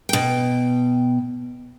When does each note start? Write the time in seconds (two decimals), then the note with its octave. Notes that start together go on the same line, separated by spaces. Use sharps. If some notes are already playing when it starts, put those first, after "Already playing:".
0.09 B2 G5